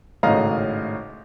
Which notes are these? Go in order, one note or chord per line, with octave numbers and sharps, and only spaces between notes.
G#1 A2 C#3 D#5 F5 A#5